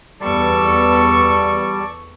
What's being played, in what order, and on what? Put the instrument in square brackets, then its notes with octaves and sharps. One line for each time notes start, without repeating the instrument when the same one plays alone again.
[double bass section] E2 B3 [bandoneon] G3 [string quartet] A4 C#6 [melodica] D5 A5